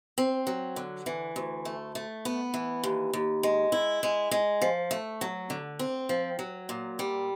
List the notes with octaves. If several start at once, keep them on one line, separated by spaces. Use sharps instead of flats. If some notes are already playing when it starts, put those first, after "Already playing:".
C4
F#3
D3
E3
D2
A3
A3
B3
E3
D#2
D#2
G#3
E4
G#3
G#3
F3
A3
F#3
D3
C4
F3
F#3
A#2
G3